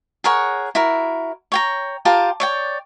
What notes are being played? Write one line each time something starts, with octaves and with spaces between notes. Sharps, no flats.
G#4 A#4 C#5 F#5
E4 F#4 A#4
C#5 G5 A#5
F4 G4 A#4 A5
C#5 D5 G5